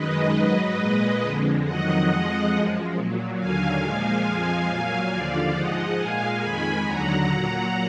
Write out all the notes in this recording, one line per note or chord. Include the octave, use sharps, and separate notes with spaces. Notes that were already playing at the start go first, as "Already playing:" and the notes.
Already playing: F#2 D#3 G#3 B4 D#5
G#2 F#3
A#2 G#3
F2 D3 G#3
F2 D#3 F#3 D#5 F#5
F2 F3 G#3
F#2 F3 G#3
A#2 F#3
D#2 D3 F#3 F5 G#5
A#2 F3 G#3
F2 F3 G#3 F5 G#5
A#2 F#3
D#2 D3 F3 D5 F5
G#2 F3 G#3 D#5 F#5
A#2 G#3 F5 G#5
F2 D#3 G#3 G#5 B5
D#2 D3 F#3 F#5 A#5
A#2 F#3